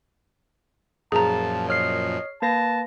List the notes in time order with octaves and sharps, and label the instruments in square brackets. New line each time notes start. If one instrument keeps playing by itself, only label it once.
[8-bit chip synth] F#2 A#2 F3 [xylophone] G#4 A#5 [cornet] A5
[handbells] C#5 F6 C7 [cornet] D#5
[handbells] A#3 B4 A#6 [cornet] A5